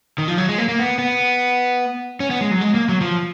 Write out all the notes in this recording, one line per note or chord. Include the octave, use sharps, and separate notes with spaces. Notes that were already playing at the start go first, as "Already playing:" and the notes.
D#3
F3
F#3
G#3
A#3
A#3
B3
B3
C#4
B3
G#3
F#3
G#3
A#3
F#3
F3